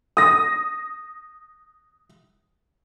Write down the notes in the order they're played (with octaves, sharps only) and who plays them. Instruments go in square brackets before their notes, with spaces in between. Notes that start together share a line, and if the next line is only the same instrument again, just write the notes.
[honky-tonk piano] D#6 A#6